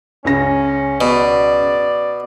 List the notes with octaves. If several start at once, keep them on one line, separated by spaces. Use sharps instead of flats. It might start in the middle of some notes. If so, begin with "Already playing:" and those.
C#2 C#3 C#4 A#6
B2 D5